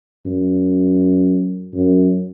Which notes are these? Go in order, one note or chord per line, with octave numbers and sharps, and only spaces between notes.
F#2
F#2